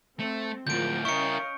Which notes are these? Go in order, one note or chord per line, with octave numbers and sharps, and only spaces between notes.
A3 C4
D2 A2 F3 G#3 A#4 G6 D7
C#4 E4 A#4 D#5 F5 C#6 C#7